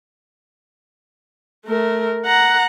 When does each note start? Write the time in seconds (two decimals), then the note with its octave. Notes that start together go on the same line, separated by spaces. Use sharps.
1.66 A3 A#4
2.26 F#5 A#5